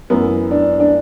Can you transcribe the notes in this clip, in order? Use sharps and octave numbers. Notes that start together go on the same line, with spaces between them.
F#2 E3 B3
D4
D4